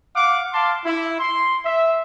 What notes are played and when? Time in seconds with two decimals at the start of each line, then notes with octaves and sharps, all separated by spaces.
0.16 F5 F#5 D6
0.53 F5 A5 C6 D6
0.84 E4
1.20 C6
1.65 E5